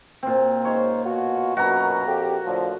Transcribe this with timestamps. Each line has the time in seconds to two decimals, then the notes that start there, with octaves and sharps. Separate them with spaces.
0.23 A#2 C4
0.65 C#2 D#4 C5 C#5
1.06 B2 F4 F#4
1.57 F#2 B2 F#4 A#4 A#5
2.07 F2 G4
2.45 A2 D3 F3